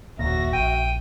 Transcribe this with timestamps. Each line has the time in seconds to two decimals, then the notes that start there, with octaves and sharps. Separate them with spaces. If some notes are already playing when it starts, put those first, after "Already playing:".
0.19 F#1 D#2 A#2 F#4 E5 A#6
0.53 A#1 G5 D#7